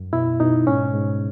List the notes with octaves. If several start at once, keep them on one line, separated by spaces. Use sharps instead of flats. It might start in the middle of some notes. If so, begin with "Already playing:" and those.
Already playing: F#2
B2 E4
B2 D#4
G#2 C#4
G#2